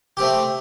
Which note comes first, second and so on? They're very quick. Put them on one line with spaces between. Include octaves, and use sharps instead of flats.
G4 C4 A3